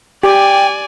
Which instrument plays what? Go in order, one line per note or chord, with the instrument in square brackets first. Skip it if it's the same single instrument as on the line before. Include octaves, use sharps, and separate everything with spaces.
[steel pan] G4 [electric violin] D5 G#5 [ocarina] G5